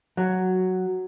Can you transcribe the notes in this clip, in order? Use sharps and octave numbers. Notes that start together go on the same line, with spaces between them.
F#3